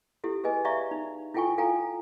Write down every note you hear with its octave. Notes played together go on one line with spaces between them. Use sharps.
E4 G4 A4
G#4 B4 D#5 G#5
D5 E5 F5 A#5 C#6
D#4
E4 F4 A4 G5 G#5 C#6
A4 F5 G5 G#5 A#5